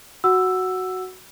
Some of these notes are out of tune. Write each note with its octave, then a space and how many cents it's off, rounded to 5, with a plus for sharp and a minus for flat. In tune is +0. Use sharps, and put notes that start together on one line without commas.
F#4 +0 F#5 +0 E6 +5